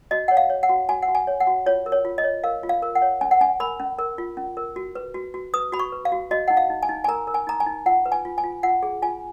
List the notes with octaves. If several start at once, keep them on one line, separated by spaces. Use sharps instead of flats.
F#4 D#5
C#5 F#5
F5
C#5
F#5
F#4
F#4 G#5
F#5
F#4
G#5
C#5
F#5
F#4
F4 C#5
A#4
C#5
F4
D#5
C#5
A#4 F5
F4
F5
A#4
F#5
C#5
C#4 G#5
F#5
C#4 G#5
A#4 B5
C#4
A#4
F4
C#4
A#4
F#4
B4
F#4
F#4
B4 D#6
F#4 B5
C#6
B4
F5
F#4
F#4 D#5
D#4 F#5
F5
D#4
G#5
D#4
G#5
A#4 A#5
A#4
G#5
D#4 A#5
G#5
D#4
F4 F#5
B4
G#5
F4
G#5
F4
F4 F#5
G#4
F4 G#5